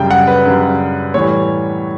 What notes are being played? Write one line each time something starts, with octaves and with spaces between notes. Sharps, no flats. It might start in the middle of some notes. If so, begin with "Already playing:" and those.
Already playing: F#2 C#3 G3 G5
F#5
B4
F#2 C#3 G3
A2 E3 G3 C#5